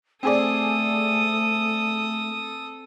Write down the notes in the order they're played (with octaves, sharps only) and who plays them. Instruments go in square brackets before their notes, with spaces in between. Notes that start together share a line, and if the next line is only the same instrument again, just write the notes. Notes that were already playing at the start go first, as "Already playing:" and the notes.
[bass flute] A3 [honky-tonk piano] C4 G#4 D5 [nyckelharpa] A4 D#6